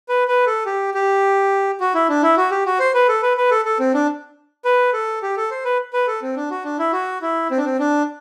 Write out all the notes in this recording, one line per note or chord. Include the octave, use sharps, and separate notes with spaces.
B4
B4
A4
G4
G4
F#4
E4
D4
E4
F#4
G4
F#4
C5
B4
A4
B4
B4
A4
A4
C4
D4
B4
A4
G4
A4
C5
B4
B4
A4
C4
D4
F#4
D4
E4
F#4
E4
C4
D4
C4
D4